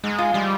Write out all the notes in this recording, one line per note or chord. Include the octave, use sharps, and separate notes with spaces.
G#2 G#3
F4
F3 G3